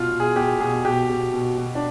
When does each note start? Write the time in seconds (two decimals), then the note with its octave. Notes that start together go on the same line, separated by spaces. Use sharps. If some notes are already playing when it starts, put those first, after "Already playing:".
Already playing: B2 F4
0.11 B2
0.20 G#4
0.36 B2 G4
0.60 B2 G#4
0.84 B2 G4
1.09 B2
1.34 B2
1.58 B2
1.75 D4